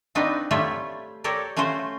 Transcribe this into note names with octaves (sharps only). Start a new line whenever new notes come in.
C4 D4 D#4 F4 F#4 B4
G3 A3 F4 C#5 E5
G4 A4 A#4 C#5 D5
A3 C#4 F4 F#4 C5